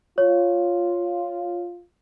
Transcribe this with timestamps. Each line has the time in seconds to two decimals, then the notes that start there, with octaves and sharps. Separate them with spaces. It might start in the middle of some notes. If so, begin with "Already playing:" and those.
0.18 F4 C#5